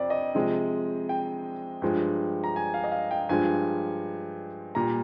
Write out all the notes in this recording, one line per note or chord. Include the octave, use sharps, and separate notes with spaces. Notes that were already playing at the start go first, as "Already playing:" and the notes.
Already playing: F2 C3 C5 D5
D#5
C3 F3 G#3
G5
G2 F3 G#3
A#5
G#5
F5
D#5
F5
G5
G2 F3 G#3 G#5
A#2 G3 A#5